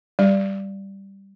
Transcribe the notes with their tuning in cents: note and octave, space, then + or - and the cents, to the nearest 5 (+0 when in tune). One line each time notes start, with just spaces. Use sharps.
G3 +0 D5 +0